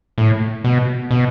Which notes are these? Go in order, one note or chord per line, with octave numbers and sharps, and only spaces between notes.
A2
B2
B2